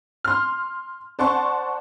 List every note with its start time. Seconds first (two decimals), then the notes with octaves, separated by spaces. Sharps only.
0.24 C6 F6
1.19 C5 D5 F#5 A5 C6 C#6